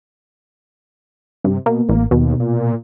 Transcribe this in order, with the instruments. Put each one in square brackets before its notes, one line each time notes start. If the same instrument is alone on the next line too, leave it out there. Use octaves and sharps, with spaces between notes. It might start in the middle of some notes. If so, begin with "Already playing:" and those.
[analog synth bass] G2 [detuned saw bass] C3
[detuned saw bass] B2 [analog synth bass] A#3
[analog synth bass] A1 [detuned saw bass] A#3
[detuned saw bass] D#2 [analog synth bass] B2
[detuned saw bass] A#2